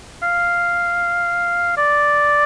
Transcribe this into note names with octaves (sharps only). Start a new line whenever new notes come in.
F5
D5